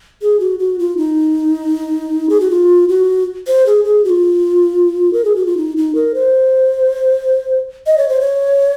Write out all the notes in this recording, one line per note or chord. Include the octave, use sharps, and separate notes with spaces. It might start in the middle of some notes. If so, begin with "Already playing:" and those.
G#4
F#4
F#4
F4
D#4
G#4
F#4
F4
F#4
C5
G#4
G#4
F#4
F4
A#4
G#4
F#4
F4
D#4
D#4
A#4
C5
D#5
C#5
C5
C#5